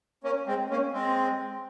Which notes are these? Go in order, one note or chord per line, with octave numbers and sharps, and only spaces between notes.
A#3 C#4
G#3 C4
A#3 C#4
G#3 C4